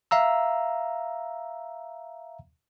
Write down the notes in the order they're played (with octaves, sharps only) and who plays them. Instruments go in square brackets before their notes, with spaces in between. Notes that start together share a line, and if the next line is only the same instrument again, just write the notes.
[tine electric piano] E5 F5 A#5 E6